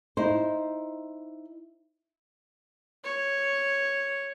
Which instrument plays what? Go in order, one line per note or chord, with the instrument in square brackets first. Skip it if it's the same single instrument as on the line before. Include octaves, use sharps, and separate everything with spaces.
[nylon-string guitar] D#4 E4 C5
[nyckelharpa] C#5